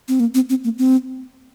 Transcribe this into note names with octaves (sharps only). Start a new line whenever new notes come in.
C4
A#3
C4
C4
A#3
C4